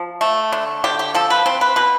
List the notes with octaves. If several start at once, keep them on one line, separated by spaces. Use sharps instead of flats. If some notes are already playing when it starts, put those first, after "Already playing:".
Already playing: F3
A3
D3
D3 G4
G4
F3 A4
B4
C4 C5
B4
B2 B4